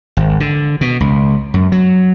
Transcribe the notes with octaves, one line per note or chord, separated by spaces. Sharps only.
G#1
D3
B2
C#2
F#2
F#3